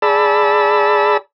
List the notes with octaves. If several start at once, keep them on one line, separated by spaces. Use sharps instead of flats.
G#4 D5 A5 B5 E6